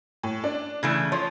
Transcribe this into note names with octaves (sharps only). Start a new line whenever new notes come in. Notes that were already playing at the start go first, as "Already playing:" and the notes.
A2
D4
C#3 E3 A3
F3 C#5